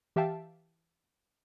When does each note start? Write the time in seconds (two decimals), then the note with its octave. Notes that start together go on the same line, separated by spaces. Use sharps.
0.16 E3 G4 E5 F5 G5 A5